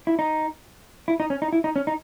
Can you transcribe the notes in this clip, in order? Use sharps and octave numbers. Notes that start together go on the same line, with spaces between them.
E4
D#4
E4
D#4
C#4
D#4
E4
D#4
C#4
D#4